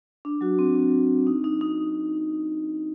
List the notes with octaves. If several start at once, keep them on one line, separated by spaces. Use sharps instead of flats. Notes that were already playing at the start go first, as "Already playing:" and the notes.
D4
F#3 F#4
C4
D4
D#4
D#4
D#4